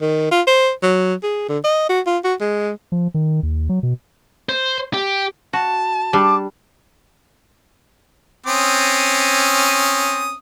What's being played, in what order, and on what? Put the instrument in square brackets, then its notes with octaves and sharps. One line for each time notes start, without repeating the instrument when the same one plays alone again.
[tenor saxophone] D#3
F4
C5
F#3
G#4
D3
D#5
F#4
F4
F#4
G#3
[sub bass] F3
D#3
D#2
F#3
B2
[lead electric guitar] C5
G4
[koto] F#4 [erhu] A5
[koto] G3 D4 [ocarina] D6
[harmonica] C4 C#4 D#6